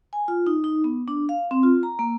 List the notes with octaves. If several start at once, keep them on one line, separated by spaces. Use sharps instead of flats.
G#5
F4
D#4
D#4
B3
D4
F5
C4
F4
A#5
A#3